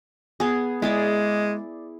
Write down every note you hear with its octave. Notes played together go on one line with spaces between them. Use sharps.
B3 G#4
G#3 E4 G#4 D5